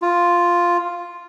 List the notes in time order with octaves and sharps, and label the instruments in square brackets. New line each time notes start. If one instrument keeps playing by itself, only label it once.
[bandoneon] F4